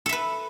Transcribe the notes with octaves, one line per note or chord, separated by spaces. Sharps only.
A4 B4 E5